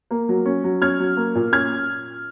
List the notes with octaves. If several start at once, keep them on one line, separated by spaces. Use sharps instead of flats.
A#3
F#3
C#4
F#3
C#4 F6 G#6
F#3
A#3
A#2
C#4 F6 G#6